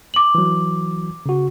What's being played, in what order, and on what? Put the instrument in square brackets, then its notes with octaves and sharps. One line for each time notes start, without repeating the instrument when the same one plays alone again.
[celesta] D6 F#7
[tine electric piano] E3 F#3
C#3 F#4